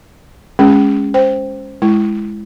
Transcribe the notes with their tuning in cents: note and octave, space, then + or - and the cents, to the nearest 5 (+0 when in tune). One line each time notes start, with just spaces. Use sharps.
G#3 +0 C#4 +0 G#4 -35
C5 +0 G5 +0
G#3 +10 E4 +15